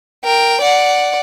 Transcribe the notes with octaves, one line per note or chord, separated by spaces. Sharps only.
A#4 G5
D5 F#5